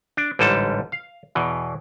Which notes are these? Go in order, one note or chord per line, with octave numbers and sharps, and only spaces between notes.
D4
A1 G#2 D3 G3 A4 A5
F5
E2 B2 E3